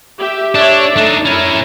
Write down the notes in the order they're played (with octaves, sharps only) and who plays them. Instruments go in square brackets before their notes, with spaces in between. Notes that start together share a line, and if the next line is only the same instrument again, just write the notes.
[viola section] G4 E5
[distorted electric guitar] D4 [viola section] C#5 D5 E5
[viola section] A3 [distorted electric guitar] D4 D#4
[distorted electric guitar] C#4 A#4 [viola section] E4